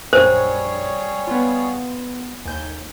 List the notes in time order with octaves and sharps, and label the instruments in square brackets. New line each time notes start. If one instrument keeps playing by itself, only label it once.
[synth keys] A#1 F#2 [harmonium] G3 G#4 C#5 [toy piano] C5
[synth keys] B3 F4
[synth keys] D#2 G6 [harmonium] G#5